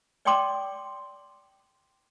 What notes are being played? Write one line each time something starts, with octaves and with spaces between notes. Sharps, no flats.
D5 D#5 G5 A5 C6 D6